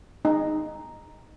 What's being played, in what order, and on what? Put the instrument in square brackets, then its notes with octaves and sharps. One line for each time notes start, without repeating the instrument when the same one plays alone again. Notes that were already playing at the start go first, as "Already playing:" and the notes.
[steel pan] D#4